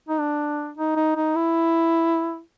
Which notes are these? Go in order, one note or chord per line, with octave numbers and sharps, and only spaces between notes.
D#4
D4
D#4
D#4
D#4
E4